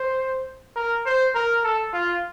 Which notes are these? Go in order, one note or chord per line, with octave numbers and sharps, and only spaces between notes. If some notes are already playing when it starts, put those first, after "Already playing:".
Already playing: C5
A#4
C5
A#4
A4
F4